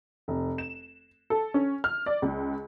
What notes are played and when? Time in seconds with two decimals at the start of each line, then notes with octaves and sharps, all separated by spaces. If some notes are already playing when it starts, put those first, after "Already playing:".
0.28 F1
0.58 E7
1.30 A4
1.54 C#4
1.84 F6
2.06 D5
2.22 C#2